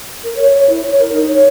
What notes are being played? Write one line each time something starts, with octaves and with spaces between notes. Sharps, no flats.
A#4
C#5
C#5
E4
C#5
A#4
D#4
C#5